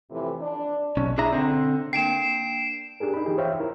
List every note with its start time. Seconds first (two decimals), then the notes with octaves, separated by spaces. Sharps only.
0.11 F2 A2 C3 E3
0.41 D4
0.97 B1 C#4
1.18 D4 E4 G#4 E5 A#5
1.33 D3 C4
1.93 A#3 D4 G5 C7 D7 E7
3.00 D4 G4 G#4 A#4
3.14 D#4 B5
3.26 E3 D#4 F4 G4 G#4
3.38 C5 C#5 E5 F5 G5
3.60 E4 A#4